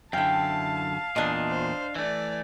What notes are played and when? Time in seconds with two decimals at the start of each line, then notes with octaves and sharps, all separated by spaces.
0.13 F#2 D3 E4 F5 G5 A5
1.16 E2 A#2 D4 D#5 A5
1.49 C5
1.95 E3 A3 D5